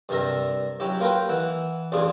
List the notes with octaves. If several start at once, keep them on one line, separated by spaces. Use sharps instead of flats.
G2 C3 G3 A#4 E5 A#5
F#3 C#4 E4 G4
A#3 F4 A#4 B4 G5
E3 E4 F#5
A1 E2 D4 F4 G#4